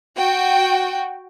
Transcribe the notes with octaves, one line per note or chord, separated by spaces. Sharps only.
F#4 G5